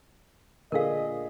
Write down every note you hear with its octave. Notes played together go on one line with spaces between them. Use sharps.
A#2 D3 G#4 A#4 D#5 F5